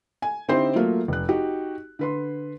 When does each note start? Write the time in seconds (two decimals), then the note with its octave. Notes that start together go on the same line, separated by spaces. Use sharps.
0.22 G#5
0.48 D3 C4 D#4 E4 G4 C5
0.76 F#3 A3 A#3 F4
1.08 F1 F#6
1.28 D#4 F#4 G4
1.99 D3 B4 C6